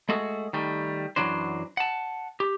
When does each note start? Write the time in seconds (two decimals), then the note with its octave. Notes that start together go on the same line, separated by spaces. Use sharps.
0.09 G#3 A3 F#4 G#4 A4
0.53 D#3 G3 A3
1.16 F#2 C#3 E3 F#3 D4 C5
1.77 F#5 A5
2.40 G4